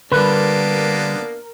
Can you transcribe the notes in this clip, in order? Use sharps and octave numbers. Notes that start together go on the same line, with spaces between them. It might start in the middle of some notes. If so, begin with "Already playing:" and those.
D3 G3 A#3 B3 D4 A#4 B4